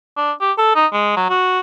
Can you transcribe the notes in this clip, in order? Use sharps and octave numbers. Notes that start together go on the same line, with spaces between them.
D4
G4
A4
D#4
G#3
F#3
F#4